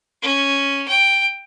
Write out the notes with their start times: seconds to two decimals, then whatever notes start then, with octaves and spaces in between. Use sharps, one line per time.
0.22 C#4
0.88 G5